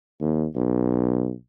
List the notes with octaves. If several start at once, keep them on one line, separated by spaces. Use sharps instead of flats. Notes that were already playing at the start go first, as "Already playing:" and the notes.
D#2
B1